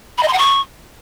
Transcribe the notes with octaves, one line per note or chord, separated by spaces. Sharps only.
B5
D#5
C6
F#5
C#6